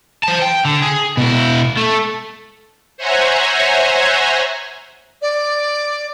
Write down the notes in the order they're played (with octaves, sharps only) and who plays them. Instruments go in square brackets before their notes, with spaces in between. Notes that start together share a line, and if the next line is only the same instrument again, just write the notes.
[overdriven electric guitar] C5 A5
G5
D3
G#4
B2 E4
A3
[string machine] C5 C#5 E5 F#5 G#5 A#5
[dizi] D5